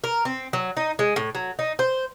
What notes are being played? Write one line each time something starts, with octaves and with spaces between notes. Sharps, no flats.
A#4
C4
F#3
D#4
G#3
A2
F#3
D#4
C5